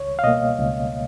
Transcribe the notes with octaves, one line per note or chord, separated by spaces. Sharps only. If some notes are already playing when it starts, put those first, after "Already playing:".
Already playing: C#2 C#5
F5
B2 A#3 D#5
C#2